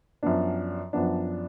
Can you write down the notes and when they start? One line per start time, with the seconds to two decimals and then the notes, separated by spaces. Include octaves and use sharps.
0.23 F#2 F3 B3 D4
0.93 F#2 F3 B3 D4